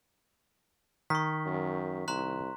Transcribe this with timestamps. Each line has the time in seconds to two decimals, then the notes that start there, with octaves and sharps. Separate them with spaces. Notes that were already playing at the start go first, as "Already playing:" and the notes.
1.10 D#3 C#6 B6
1.46 F#2
2.08 C2 A#5 C6 F#6